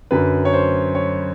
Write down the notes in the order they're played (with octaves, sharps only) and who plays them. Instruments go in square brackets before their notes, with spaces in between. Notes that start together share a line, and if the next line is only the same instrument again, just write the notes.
[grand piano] F#2 D3 F#3 B4
C#5
C5
C#5